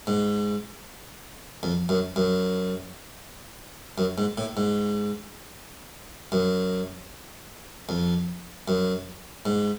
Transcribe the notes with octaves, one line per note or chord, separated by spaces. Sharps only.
G#2
F2
F#2
F#2
F#2
G#2
A2
G#2
F#2
F2
F#2
G#2